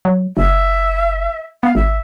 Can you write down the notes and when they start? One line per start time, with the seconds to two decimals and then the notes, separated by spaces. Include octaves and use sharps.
0.05 F#3
0.37 F#1 E5
1.63 B3 F5
1.75 G#1 E5